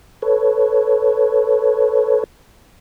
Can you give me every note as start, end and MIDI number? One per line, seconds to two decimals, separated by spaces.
0.22 2.24 69
0.22 2.24 71
0.22 2.24 73